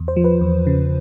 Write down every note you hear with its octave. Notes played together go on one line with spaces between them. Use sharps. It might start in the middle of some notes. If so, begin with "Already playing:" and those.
Already playing: E2
C5
F3
B4
E2
C#3